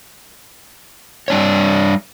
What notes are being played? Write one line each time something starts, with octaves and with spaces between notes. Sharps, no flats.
G3 D4 C#5